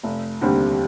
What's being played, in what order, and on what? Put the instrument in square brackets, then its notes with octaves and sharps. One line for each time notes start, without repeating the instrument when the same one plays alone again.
[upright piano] F1
D#2 D3 G3 C4